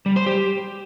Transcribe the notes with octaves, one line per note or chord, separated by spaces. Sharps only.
G3
C5
G4